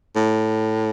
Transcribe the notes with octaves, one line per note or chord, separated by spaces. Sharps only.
A2